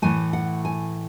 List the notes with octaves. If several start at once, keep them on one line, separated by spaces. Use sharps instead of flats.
A2 E3 A3 G#5
F#5
G#5